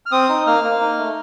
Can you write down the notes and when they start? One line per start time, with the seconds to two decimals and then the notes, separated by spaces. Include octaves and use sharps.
0.06 F6
0.12 C4 D#6
0.29 D#4
0.47 A#3 F6
0.64 A#3
0.81 D#4
0.99 A3